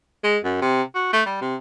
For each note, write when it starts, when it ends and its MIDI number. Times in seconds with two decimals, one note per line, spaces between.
0.24 0.38 56
0.44 0.57 42
0.62 0.82 48
0.95 1.13 66
1.13 1.23 57
1.26 1.38 55
1.41 1.56 48